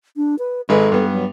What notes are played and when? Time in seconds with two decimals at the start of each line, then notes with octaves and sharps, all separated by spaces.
0.17 D4
0.39 B4
0.69 G#1 G#3 A4 B4
0.92 G2 B3
1.12 F#3